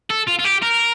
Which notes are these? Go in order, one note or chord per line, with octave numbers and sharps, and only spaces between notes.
A4
F4
F4
G4
A#4